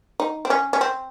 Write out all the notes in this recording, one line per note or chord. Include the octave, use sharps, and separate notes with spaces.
D#4
C4
C#4
C#4
C4